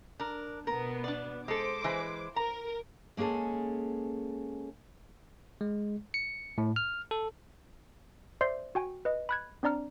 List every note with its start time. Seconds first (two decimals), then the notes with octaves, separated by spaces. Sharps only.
0.20 D4 A#4
0.67 B2 B3 A#4
1.04 D4 D5
1.48 G#3 A4 C5 D6
1.84 E3 G#3 B4
2.36 A#4 A#5
3.17 G#3 A#3 C#4 G#4 A4
5.61 G#3
6.14 C#7
6.58 A2
6.76 F6
7.11 A4
8.41 C5 D5 E5 C6 G6 C7
8.75 F#4 G5 G#5
9.05 B4 D#5
9.29 B5 F#6 G#6
9.63 C4 D4 D5 A#5 F6